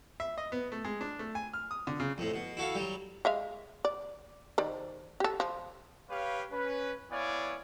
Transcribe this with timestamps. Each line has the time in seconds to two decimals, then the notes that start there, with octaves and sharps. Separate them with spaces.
0.20 E5
0.38 D#5
0.52 B3
0.72 A3
0.85 G#3
1.01 D4
1.19 A3
1.35 G#5
1.53 F6
1.71 D#6
1.87 D3
2.00 C#3
2.18 F2 A2
2.34 B2
2.57 E4 F#4 A4 F5
2.75 F#3 G3
3.25 G#3 E5 F5
3.85 D5
4.58 D#3 C5 D5
5.20 G4 A4
5.40 F3
6.10 G4 B4 C#5 F5
6.51 C#4 B4
7.12 B3 E4 C#5 D5 F5 G#5